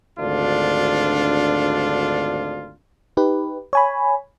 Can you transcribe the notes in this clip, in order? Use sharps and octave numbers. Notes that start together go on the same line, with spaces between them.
G#1 D2 D4 F4
D#4 G4 B4
C#5 G#5 B5